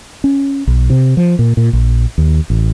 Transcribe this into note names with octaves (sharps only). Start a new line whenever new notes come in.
C#4
B1
C3
F3
A#2
A#2
A#1
D#2
A1